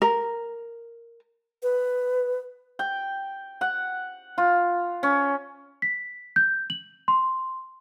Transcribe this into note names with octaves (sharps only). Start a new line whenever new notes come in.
A#4
B4
G5
F#5
F4
C#4
B6
G6
F#7
C6